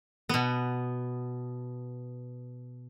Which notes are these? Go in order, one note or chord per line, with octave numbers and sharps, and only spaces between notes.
B2 B3